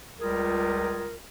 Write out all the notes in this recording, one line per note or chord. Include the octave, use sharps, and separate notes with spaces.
C#2 G3 F4 G#4 A#4